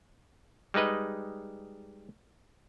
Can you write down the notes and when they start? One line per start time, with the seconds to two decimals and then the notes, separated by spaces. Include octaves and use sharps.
0.74 G3 G#3 D#4 B4 D#5